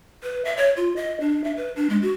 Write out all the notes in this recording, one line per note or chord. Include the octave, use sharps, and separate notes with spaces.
B4
E5
C#5
F4
D#5
D4
E5
B4
D4
G#3
F#4